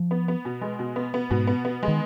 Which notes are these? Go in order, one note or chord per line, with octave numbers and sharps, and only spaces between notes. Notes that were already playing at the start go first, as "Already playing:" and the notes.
Already playing: F3
B3
B3
B2
G#3
B2
B3
B3
G#2 B2
B3
B3
G#3
D#3